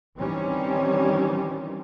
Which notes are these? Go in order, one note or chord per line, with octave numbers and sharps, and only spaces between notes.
D#3 E3 G3 C4 C#4